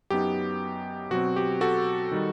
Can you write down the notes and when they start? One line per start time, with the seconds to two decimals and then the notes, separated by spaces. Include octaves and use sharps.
0.10 F#2 F#3 B3 D#4 G4
1.11 B2 F#3 C4 F#4
1.36 G4
1.61 F#4 A4
2.12 D#3 G3 D#4